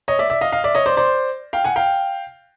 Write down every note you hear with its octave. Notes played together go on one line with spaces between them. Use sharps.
C#5 D#5
D5 E5
D5 E5
D#5 F5
D#5 F5
D5 E5
C#5 D#5
C5 D5
C5 D5
F5 G5
F#5 G#5
F5 G5